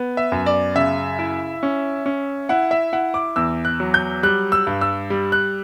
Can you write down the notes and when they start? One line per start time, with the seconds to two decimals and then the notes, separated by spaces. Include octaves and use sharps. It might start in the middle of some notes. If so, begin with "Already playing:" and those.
Already playing: B3
0.17 E5
0.32 F#2
0.46 D5
0.76 C#3 E5
1.19 E4
1.63 C#4
2.06 C#4
2.49 E4 F#5
2.71 E5
2.93 E4 F#5
3.14 D6
3.36 E2 E6
3.65 F#6
3.80 F#3
3.94 G6
4.23 G3 F#6
4.52 E6
4.67 G2
4.81 E6
5.10 G3
5.32 F#6